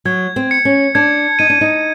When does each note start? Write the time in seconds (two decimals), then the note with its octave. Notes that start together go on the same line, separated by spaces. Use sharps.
0.05 F#3 G#6
0.36 C4
0.51 C#7
0.65 C#4
0.95 D4 G#6
1.39 D#4 D#7
1.50 D4
1.61 D#4